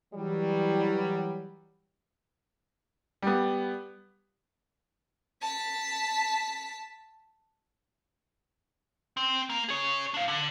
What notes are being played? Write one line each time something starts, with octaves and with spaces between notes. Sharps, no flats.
E3 F#3 G3
G3 B3
A5 B6
C4
A#3
G#4 C#5
D4 F5
D3